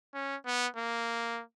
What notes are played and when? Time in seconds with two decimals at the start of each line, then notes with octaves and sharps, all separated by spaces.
0.14 C#4
0.46 B3
0.77 A#3